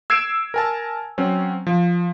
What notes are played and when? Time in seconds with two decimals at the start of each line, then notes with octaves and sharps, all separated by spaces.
0.10 E6 G#6 C7 D7 E7
0.54 A#4 G#5 A5
1.18 F#3 C4 C#4
1.67 F3